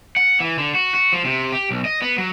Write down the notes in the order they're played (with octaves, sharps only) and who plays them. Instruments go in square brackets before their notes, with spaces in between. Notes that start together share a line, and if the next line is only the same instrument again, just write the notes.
[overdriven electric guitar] F#5
E3
D3
F#4
F#4
F3
C3
G4
B1
D#5
B3
F#3